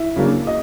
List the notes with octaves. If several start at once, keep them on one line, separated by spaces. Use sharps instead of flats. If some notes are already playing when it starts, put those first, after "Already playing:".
Already playing: E4 E5
C#3 F#3 A#3 D4
D#5